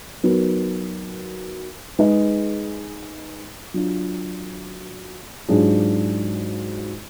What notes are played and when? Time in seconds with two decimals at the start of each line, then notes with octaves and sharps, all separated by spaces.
0.23 F#3 B3 D#4 F#4 A#4
1.99 G#3 D#4 G#4 B4 D#5
3.74 F#3 D4 F4
5.49 G#2 F#3 D4 F4 G#4